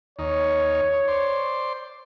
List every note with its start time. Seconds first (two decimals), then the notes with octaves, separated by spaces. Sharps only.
0.19 D#2 D#4 C#5
1.08 C5 D5 C6